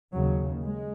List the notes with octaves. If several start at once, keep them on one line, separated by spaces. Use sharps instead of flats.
D#2 C#3 F#3
G#3